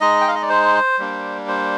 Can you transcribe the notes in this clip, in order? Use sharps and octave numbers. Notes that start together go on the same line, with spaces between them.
G#3 D#4 D#5
G5
F5
D#5
D5
C5
G3 A#3 D4
C5